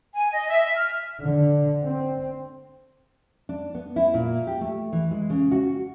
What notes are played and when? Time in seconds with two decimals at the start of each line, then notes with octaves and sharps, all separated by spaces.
0.13 G#5
0.33 D#5
0.48 E5
0.63 E5
0.75 F6
1.20 D3
1.85 C4
3.49 D4
3.75 B3
3.96 E4
4.14 A#2
4.47 G4
4.61 A3
4.93 E3
5.11 G#3
5.30 C#3
5.51 F#4